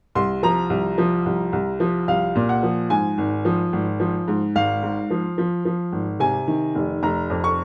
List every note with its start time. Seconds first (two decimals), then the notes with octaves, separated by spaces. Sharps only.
0.15 C2 C6
0.43 F3 A#5
0.70 C2
0.98 F3
1.26 C2
1.53 C2
1.80 F3
2.08 C2 F5
2.36 A#2
2.49 F#5
2.63 F3
2.90 G#2 G#5
3.18 G#1
3.45 F3
3.73 G#1
4.00 F3
4.28 G#2
4.55 G#1 F5
4.83 G#2
5.10 F3
5.38 F3
5.65 F3
5.92 G#1
6.20 C3 G#5
6.47 D#3
6.75 F1
7.03 F1 A#5
7.30 F2
7.44 C#6